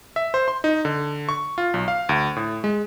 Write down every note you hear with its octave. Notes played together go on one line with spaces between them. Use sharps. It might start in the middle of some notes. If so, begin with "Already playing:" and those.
E5
C5
C6
D#4
D3
C#6
F4
B1
F5
D2
A2
G#3